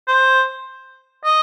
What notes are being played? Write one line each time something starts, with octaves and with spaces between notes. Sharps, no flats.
C5
D#5